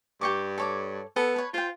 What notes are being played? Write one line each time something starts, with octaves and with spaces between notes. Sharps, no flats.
G2 G4 C#6 D6
A4 C#5 D6
B3 A4
B4 C#5
F4 C5 G5